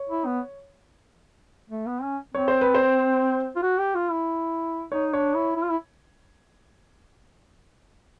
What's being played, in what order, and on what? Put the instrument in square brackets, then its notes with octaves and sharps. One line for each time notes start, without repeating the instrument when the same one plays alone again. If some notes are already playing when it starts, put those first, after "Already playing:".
Already playing: [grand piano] C#5
[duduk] E4
B3
A3
B3
C#4
[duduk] C4 [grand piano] C#5
[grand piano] C5
B4
C5
[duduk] F4
F#4
G4
F4
E4
[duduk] D#4 [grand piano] C#5
[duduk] D4 [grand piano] C#5
[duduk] E4
E4
F4
E4